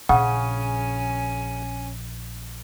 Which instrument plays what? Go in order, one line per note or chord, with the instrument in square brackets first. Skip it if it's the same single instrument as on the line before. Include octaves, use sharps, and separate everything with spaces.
[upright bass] A#1 [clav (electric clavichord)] C#3 [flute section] C#4 G#5 [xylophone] F#5